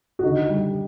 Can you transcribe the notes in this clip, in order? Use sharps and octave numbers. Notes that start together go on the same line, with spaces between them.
F#4
D3 D#4
G3